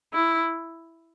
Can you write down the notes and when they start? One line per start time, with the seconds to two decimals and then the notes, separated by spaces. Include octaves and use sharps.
0.13 E4